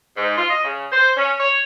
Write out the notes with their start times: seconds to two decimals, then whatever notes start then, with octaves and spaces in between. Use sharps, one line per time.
0.16 G#2
0.37 F4
0.50 D#5
0.64 C#3
0.91 C5
1.17 C#4
1.40 C#5